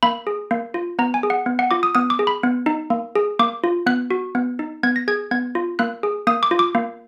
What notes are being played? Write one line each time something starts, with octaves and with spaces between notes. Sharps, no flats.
A#3 B5
G#4
A#3
F4
B3 A#5
G#5
G#4
F#5
B3
F#5
F4 D6
D#6
B3 D#6
D6
G#4
B5
B3
D#4
A#3
G#4
A#3 D6
F4
B3 F#6
F#4
B3
D#4
B3 G#6
A#6
G#4 G#6
B3 G#6
F4
A#3 F#6
G#4
A#3 D#6
D6
F4
D6
A#3